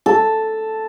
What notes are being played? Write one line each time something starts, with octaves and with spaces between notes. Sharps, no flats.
A4